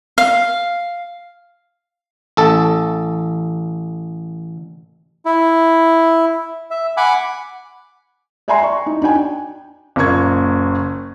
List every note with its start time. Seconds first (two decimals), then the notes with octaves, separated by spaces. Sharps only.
0.18 F5
2.37 A1 A4
5.25 E4
6.71 E5
6.97 F#5 G#5 B5 D6
8.48 D5 E5 G5 G#5 A#5 C6
8.63 C#6
8.86 D#4
9.02 D4 D#4 G5 G#5
9.96 F#1 A#2 A#3 C#6 G#6